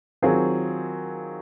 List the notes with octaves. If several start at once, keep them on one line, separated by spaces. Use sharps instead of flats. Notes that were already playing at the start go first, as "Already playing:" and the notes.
D#3 F#3 C4 F4 G#4